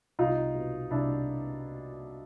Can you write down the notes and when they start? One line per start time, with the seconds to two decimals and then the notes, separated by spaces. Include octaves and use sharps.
0.19 C2 D#4 F4
0.54 B2
0.91 C2 D4 E4